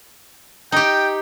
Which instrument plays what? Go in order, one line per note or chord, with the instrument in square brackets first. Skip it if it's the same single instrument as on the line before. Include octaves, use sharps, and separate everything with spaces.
[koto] D#4 G4 [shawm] G5